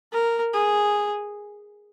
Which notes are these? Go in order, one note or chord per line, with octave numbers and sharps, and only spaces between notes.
A#4
G#4